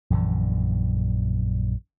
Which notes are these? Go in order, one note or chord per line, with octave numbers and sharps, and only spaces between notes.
A#1 F#2 D3 E3